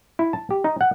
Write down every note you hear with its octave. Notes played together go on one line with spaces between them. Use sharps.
E4
A5
G4
D#4
F#5